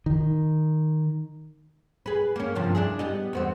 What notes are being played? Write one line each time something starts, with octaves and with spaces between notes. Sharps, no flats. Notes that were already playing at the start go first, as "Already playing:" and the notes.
D#3
G#4 B4
A#3 C#4
G2 C3 F3
D4 E4 G#4
G3 B3 D#5
E2 B3 C4